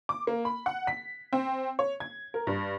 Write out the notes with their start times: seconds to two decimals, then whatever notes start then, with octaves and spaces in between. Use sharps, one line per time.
0.09 D6
0.27 A#3
0.45 B5
0.66 F#5
0.87 B6
1.33 C4
1.79 C#5
2.00 G#6
2.34 A#4
2.47 G2